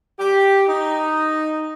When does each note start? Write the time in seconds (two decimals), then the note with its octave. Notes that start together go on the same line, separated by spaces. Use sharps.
0.19 G4
0.68 D#4